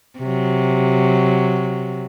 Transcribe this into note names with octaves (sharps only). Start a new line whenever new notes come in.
C3 F#3